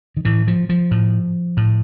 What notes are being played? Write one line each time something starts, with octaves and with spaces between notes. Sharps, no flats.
D#3
A2 E3
F3
F3
A2
A2